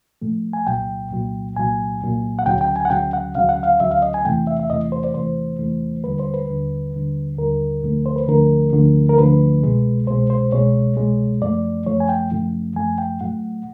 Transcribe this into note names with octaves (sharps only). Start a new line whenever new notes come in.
A2 F3 A3
G#5
C2 A#2 F#3 G5
C2 A#2 F#3
C2 A#2 F#3 G#5
C2 A#2 F#3
F#5
D2 C#3 F#3 G5
G5
G#5
F#5
D2 C#3 F#3 G5
F#5
D2 C#3 F#3 F5
F#5
F5
D2 C#3 F#3 E5
F5
D#5
G#5
E2 C3 E3 A3 G5
E5
E5
E2 C3 E3 A3 D#5
C5
D5
E2 C3 E3 A3 C5
E2 C3 E3 A3
D#2 D3 G3 B4
C5
B4
D#2 D3 G3
D#2 D3 G3
D#2 D3 G3 A#4
D2 D3 F3 A3
C5
B4
D2 D3 F3 A3 A#4
D2 D3 F3 A3
A#4
D2 D3 F3 A3 B4
C2 B2 G#3
C2 B2 G#3 C5
C5
C2 B2 G#3 C#5
C2 B2 G#3
F#2 C#3 F3 A3 D5
F#2 C#3 F3 A3 C#5
G#5
G5
F#2 C#3 F3 A3
F#2 C#3 F3 A3 G#5
G5
A2 F#3 A3 F#5